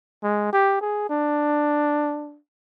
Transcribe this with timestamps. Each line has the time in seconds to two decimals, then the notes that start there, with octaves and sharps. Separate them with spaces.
0.23 G#3
0.53 G4
0.81 G#4
1.09 D4